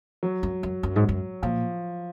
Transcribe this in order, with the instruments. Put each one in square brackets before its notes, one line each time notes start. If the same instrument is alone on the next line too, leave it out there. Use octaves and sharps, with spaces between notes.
[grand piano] F#3
[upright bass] F#2
F#2
F#2
G#2
F#2
[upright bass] A#2 [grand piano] F3